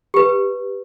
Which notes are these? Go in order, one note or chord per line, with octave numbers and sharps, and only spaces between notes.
G4 B4